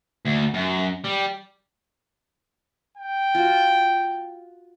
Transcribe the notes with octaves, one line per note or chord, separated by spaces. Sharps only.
D2
F#2
G3
G5
F4 F#4